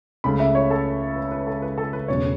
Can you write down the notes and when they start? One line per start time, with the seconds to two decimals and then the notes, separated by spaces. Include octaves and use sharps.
0.24 C#2 C#3 A3 B5
0.40 E5
0.55 C#5
0.71 A4
1.16 B4
1.31 B4
1.47 A4
1.62 B4
1.78 A4
1.93 B4
2.08 E1 E2 C#3 F#3 A3 C#5